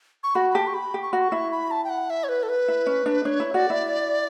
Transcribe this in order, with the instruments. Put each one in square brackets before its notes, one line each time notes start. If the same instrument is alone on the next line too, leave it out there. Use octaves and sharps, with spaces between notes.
[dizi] C#6
[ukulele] F#4 [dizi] B5
[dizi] B5
[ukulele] G4 [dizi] A5
[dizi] C#6
B5
[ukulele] G4
[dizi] C#6
[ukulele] F#4 [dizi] B5
[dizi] C#6
[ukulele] E4
[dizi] B5
A5
G5
F#5
E5
C#5
B4
A4
B4
[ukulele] E4
C#4
D4
[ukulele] D4 [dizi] C#5
[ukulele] E4
[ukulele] F#4 [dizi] D5
[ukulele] E4